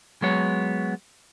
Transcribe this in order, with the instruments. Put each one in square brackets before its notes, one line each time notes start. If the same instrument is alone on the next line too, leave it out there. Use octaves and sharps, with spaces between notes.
[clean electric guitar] F#3 G#3 B3 C#5